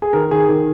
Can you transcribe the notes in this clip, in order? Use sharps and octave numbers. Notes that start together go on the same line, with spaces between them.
G#4
D#3 A#4
D#3 G#4
D#3 G#4